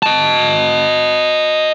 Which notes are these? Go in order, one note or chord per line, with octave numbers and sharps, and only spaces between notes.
D#5 A5